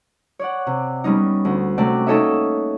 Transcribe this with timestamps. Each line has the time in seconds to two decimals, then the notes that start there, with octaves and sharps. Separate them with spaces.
0.39 C#5 D5 F#5
0.67 C3
1.04 G3 B3 C#4 D#4
1.45 D2
1.78 C3 A3 C#4 F#4 D5 G5
2.06 A#3 D#4 A4 C#5 D#5 E5